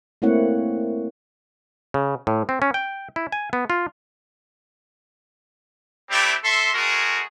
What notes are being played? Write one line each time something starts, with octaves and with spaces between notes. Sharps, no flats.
A3 A#3 C4 E4 C#5 F#5
C#3
A2
C4
C#4
G5
E4
G#5
B3
F4
G3 A3 C4 E4 G4
A4 E5 C6
G#3 A3 F#4 G#4 A#4